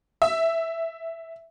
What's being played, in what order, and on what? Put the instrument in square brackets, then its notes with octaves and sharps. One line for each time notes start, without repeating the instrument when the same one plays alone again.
[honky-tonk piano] E5